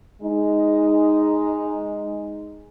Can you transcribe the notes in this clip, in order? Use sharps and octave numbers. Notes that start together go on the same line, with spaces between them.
G#3 D#4